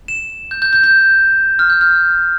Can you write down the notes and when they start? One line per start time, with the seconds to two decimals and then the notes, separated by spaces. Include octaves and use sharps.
0.08 E7
0.51 G6
0.62 G6
0.73 G6
0.84 G6
1.59 F6
1.70 G6
1.81 F6